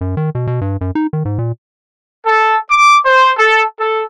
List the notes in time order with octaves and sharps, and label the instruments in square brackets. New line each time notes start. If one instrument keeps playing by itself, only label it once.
[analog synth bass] F#2
D#3
B2
B2
G2
F#2
D#4
D#3
G#2
A#2
[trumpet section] A4
D6
C5
A4
A4